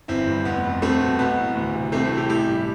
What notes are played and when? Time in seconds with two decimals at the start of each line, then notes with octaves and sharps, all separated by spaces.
0.08 G1 C4 E4
0.27 G2
0.45 F1 B3
0.64 F2
0.82 C2 A3 C4
1.00 B2 B3
1.19 B1 B3
1.37 A2
1.55 D2
1.74 C3
1.92 C2 A3 C4
2.05 C4 E4
2.12 C3
2.17 E4 G4
2.29 A1 E4 G4
2.48 G2